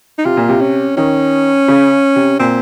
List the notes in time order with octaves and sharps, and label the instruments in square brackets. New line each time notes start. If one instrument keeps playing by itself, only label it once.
[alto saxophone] D#4
[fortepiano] C3 [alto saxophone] F4
[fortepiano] A#2
C3
[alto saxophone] C#4
[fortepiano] D#3 [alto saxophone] C#4
[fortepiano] C#3
C3
[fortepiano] A#2 [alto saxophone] C4